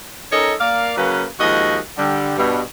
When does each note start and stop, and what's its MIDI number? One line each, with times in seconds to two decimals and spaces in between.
0.31 0.54 61
0.31 0.54 63
0.31 0.54 69
0.31 0.54 70
0.31 0.54 73
0.31 0.54 75
0.60 0.93 58
0.60 0.93 74
0.60 0.93 77
0.96 1.23 49
0.96 1.23 54
0.96 1.23 58
0.96 1.23 61
0.96 1.23 71
1.40 1.77 39
1.40 1.77 53
1.40 1.77 56
1.40 1.77 66
1.40 1.77 75
1.98 2.36 50
1.98 2.36 55
2.37 2.59 43
2.37 2.59 47